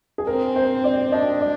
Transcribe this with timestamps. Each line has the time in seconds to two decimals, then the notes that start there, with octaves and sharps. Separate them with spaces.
0.18 G#4
0.27 C4 A#4
0.56 C5
0.84 D5
1.12 D4 D#5
1.41 D5